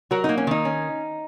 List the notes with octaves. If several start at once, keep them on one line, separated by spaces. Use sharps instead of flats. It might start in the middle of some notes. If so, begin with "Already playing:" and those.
F#3 F#4 A#4
A#3 D#4
C#4
D#3 D#4
C#4